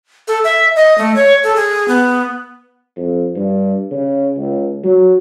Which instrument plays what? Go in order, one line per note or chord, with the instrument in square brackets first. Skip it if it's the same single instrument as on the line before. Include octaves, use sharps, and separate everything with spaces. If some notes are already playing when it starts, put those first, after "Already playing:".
[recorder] A4
E5
D#5
A3
C#5
A4
G#4
B3
[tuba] F2
G2
C#3
C#2
F#3